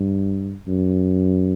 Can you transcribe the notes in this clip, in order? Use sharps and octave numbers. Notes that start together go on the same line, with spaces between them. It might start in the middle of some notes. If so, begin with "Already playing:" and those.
Already playing: G2
F#2